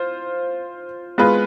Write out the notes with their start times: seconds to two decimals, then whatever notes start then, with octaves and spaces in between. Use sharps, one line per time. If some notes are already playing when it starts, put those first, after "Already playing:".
Already playing: F4 C5
1.18 G#3 B3 F4 G#4 B4